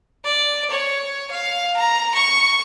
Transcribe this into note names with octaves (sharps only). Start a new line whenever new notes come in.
D5
C#5
F5
A#5
C#6